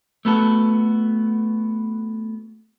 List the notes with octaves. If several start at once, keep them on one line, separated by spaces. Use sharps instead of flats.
A3 B3 F#4 A4